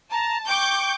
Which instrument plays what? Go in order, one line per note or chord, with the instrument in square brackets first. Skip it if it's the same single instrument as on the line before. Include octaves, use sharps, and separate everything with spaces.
[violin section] A5 [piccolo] A#5
[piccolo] G5 [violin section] C#6 D6 G6